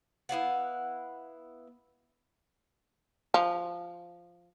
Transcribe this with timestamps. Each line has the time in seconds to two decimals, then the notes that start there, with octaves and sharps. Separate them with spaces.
0.29 B3 E4 F5 F#5
3.34 F3